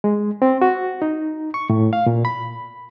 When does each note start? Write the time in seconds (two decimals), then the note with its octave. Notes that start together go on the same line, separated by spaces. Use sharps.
0.04 G#3
0.42 C4
0.62 F#4
1.02 D#4
1.54 C#6
1.70 A2
1.93 F5
2.06 A#2
2.25 B5